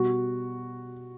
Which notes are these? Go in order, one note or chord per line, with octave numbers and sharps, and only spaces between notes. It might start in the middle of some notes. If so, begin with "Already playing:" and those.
Already playing: B2 G3 F#4